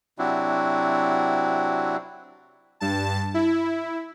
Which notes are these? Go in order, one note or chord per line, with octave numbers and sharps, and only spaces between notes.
C3 F#3 C4 D4 E4 F#4
G2 A5
E4